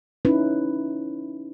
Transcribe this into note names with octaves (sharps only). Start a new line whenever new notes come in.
C#4 D#4 E4 B4